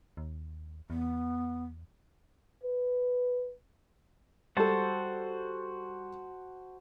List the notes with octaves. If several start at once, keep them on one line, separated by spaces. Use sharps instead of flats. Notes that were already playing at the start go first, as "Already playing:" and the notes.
D#2
E2 B3
B4
G3 F#4 A4 C5 A5